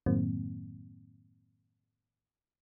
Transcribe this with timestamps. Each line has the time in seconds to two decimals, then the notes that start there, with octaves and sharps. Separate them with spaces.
0.06 F#2 A2 D#3 F#3 A#3 C4